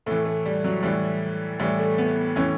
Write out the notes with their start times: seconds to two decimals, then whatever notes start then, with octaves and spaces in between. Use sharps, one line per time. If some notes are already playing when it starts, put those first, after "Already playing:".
0.06 A2 E3 A3
0.25 A3
0.46 G3
0.64 F#3
0.83 A2 E3 G3
1.59 A2 E3 G3
1.79 A3
1.98 B3
2.36 A2 E3 C#4